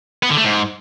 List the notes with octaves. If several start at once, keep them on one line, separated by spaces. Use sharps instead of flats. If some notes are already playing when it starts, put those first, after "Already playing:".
B3
D3
A3
G#2